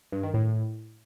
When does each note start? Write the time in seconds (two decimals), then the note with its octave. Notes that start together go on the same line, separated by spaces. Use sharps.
0.12 G2
0.23 D#3
0.34 A2